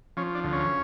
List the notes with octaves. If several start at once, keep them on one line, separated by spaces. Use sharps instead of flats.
F3 C#4
D4
D2
C#4